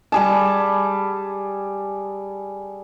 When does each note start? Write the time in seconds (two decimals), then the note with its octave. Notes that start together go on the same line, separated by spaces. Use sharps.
0.12 G3 G#4 A5